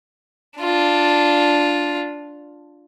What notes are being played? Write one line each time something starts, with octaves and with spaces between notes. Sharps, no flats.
D4 F4